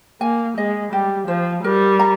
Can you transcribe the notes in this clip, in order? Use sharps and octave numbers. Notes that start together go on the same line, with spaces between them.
A#3 G#5
G#3 D#5
G3 G4
F3 C5
G3 A#4
A#5